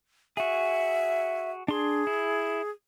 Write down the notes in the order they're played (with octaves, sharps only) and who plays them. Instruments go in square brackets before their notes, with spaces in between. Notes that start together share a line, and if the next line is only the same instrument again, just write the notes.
[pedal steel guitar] F#4 G#4 [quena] E5
[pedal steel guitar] D4 C6 [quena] G#4
[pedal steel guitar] E4